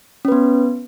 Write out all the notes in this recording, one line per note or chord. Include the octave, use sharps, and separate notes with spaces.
B3 C#4 B4